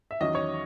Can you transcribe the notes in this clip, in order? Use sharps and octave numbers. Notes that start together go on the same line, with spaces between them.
E5
E2 D#3 F#3 C#4 D#5
C#5